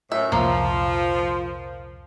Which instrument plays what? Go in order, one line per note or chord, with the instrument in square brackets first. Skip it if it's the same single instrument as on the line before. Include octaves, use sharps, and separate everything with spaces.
[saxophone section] F#2 A2 [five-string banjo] E5
[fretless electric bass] C2 F2 A#2 [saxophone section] F3 [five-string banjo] A#3